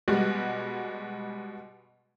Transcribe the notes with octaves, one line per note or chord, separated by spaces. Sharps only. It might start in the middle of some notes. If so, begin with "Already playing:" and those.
B2 G3 G#3 F#4